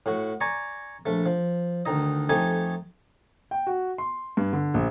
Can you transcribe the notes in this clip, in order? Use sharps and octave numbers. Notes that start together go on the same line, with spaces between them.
A2 F#4
D5 G#5 A#5 C#6
A#1 A3
F3
D2 D#3 D#4 D#5
F2 A3 D#4 G4 G#5
G5
F#4
C6
G2
D3
A#1